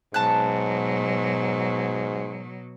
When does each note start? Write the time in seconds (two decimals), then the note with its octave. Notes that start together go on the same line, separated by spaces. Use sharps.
0.14 G#2 B2 F#3 A5 F#6